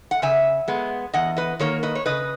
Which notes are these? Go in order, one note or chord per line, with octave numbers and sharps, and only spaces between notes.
F#5
C#3 E5 G#5
G#3 B3
E2 D#5 F#5
B4 D#5
D#3 A#3 A#4 C#5
B4 D#5
C#5
C#3 B4 D#5